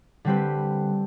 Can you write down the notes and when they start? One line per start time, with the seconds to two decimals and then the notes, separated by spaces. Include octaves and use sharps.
0.25 D3 G3 C4 G4 B4